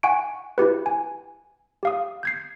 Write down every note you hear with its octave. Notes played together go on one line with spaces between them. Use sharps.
F#5 G#5 C#6 D7
E4 F#4 G4 B4
G#5
G4 F5 D#6
G6 G#6 C7